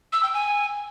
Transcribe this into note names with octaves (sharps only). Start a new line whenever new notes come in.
E6
G5
G#5